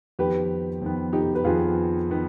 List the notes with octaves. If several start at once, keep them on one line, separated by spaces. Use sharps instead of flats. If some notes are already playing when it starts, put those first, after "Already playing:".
F2 D#3 B3 G4 B4
F2 D#3 B3
D#4 G4
B4
F2 D#3 B3 F4 G#4
D#3 B3